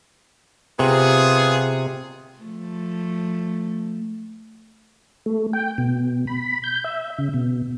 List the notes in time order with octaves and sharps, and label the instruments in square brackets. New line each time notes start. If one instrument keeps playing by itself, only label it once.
[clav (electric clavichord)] C3 [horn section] B3 F4 G#4
[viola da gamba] F3 A3
[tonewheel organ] A3
G5
B2
B5
G6
E5
C#3
B2